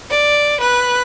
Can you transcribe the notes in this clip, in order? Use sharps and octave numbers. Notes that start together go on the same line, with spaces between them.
D5
B4 F#6